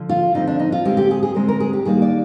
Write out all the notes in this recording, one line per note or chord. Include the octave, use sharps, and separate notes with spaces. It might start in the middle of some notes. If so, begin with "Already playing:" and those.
Already playing: D3 F3
F4
D3 F3 C4 D#4
D4
D#4
F4
D3 G#3 C4 G4
G4
G#4
G#4
D3 G#3 C4 A#4
A#4
G#4
G4
D#3 G3 A#3 D4 G#4
D5